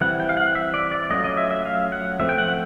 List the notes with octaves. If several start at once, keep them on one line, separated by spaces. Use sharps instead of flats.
E3 G3 C4 E4 F#5
G5
F5
F#5
E5
D5
D5
F#3 A3 C#4 F4 D#5
D#5
E5
E5
F5
F#5
F3 A3 C4 E5
G5
F#5